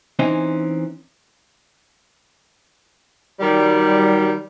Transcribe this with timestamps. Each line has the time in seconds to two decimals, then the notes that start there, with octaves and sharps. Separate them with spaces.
0.19 E3 C4 C#4 D#4
3.40 D#3 F#3 G3